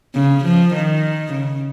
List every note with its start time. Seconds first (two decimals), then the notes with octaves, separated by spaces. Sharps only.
0.15 C#3
0.45 F3
0.74 D#3
1.33 C#3